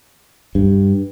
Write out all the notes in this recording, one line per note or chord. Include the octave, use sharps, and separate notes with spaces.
G2